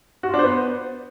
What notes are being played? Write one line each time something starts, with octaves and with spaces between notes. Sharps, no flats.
F#4
F4
D4
C5
B3